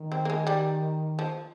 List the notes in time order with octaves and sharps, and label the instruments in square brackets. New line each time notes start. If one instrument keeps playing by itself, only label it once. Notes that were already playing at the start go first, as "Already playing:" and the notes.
Already playing: [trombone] D#3
[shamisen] C4
A#3
G#3
G3
F3